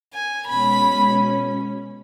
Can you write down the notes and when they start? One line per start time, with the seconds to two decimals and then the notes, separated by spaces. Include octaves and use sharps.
0.14 G#5
0.48 B2 G#3 C#4 B5